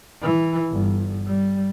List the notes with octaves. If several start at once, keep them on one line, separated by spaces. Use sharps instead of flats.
E3
G1
G3